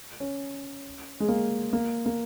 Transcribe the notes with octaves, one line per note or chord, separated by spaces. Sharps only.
C#4
G#3
A#3
A#3
A#3